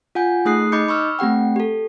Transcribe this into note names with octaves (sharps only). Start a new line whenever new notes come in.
F4 F#5 G#5 G6
A3 D#4 G#4 D#6 F#6 C7
D#4 D#5 B5 D6 G6 C#7
B5 C#6 E6 F6
A3 C4 G4 F#5 G5
G4 A4